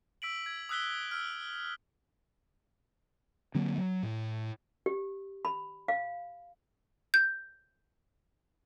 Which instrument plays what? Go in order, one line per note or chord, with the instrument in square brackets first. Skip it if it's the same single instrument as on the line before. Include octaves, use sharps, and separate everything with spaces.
[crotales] E6 B6 D7 F#7
G#6
D#6 E6 F#6 B6 G7
E6 F6
[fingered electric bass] D3 F#3 A#3 C4
F#3
A2
[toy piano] G4
B5
F5
[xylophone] G6